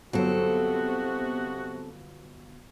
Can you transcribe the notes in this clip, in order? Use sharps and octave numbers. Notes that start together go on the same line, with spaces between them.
G1 C3 F#3 B3 C4 F#4 A4